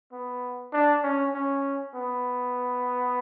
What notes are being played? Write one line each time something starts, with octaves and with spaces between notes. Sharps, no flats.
B3
D4
C#4
C#4
B3